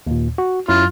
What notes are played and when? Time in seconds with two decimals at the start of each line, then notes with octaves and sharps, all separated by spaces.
0.07 D#2 A#2
0.38 F#4
0.68 F#2 F#3 E4 F4